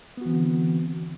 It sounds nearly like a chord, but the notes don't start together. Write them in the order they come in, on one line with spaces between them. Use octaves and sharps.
B3 F#4 E3 C4 D3